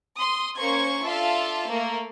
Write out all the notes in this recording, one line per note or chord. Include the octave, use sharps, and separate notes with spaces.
C6 D#6
A#3 C#4 C5 C#6 G#6
D4 F4 A4 E5 F5 A5
A3 A#3